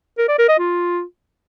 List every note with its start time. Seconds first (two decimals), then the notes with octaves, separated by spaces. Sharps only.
0.18 A#4
0.28 D5
0.38 A#4
0.49 D#5
0.59 F4